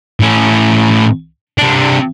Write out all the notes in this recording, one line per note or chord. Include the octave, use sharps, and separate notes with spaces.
A2 C#4
C3 D4